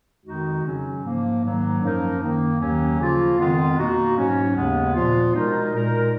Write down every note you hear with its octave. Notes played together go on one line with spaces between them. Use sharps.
F2 D#3 G#3 D#4 F#4
C#3 F#3 C#4
G#2 F3 A#3
G#2 D#3 F#3 A#3
F#2 F3 A#3 D#4 A#4
F#2 D#3 A#3
D#2 D#3 F#3 A#3 C#4
C#3 F3 A#3 F4
F2 D#3 G#3 B3 F4
B2 A#3 D#4 F#4
G#2 F#3 C#4
D#2 C#3 G#3 B3
A#2 F3 B3 F4
B2 G#3 D#4 A#4
A#2 G#3 D#4 A#4